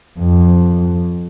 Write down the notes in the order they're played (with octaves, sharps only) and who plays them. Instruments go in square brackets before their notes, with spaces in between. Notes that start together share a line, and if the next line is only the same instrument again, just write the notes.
[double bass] F2